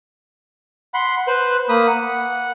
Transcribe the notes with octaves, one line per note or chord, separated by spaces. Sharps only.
F#5 B5 C6
B4 C5 F#6
A#3 B5 D#6
F#5